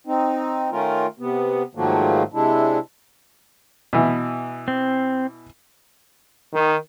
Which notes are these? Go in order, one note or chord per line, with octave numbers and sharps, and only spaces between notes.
C4 D#4
D#3 A3 C#4 F4 A#4
C3 B3
G#2 D#3 F3 F#3 A3 A#3
C3 G#3 D4 E4
B2 E3
C4
D#3